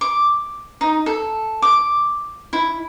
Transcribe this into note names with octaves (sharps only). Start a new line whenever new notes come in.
D6
D#4
A4
D6
E4